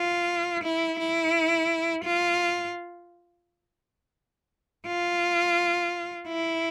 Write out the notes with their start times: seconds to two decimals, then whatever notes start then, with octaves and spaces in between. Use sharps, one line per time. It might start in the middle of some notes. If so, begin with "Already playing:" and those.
Already playing: F4
0.64 E4
0.99 E4
2.04 F4
4.87 F4
6.28 E4